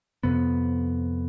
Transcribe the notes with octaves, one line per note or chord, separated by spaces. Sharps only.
F2 C3 B3